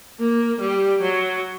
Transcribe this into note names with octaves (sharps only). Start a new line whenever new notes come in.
A#3
G3
F#3